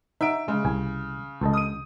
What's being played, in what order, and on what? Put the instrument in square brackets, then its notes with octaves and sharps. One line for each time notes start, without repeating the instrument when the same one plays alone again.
[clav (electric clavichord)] D#4 F#5 [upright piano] E5 D7
[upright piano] C#3 [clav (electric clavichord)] G#3
[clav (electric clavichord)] C2 G#5
C#2 A4 D#5
[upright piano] D#6 D#7